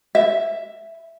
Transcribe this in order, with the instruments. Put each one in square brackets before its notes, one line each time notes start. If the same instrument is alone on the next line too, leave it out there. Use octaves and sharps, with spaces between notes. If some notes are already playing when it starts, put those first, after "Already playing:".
[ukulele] E5